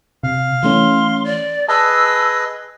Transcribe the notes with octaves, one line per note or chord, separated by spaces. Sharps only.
C3 F5
E3 A3 C#4 C6
D5
G#4 B4 D#5 A5 E6